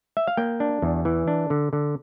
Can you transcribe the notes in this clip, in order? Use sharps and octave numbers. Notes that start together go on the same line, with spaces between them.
E5
F5
A#3 G5
D4
E2
E3
D4
D3
D3